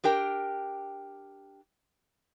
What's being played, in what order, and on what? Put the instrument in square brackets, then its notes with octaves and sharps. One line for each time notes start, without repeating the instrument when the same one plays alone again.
[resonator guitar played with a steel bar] D4 G4 A#4 G5